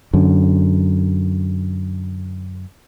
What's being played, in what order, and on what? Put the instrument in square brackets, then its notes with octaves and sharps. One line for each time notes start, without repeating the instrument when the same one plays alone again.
[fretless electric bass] F#2 D3